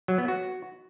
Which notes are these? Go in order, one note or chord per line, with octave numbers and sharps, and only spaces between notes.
F#3
B3
F#4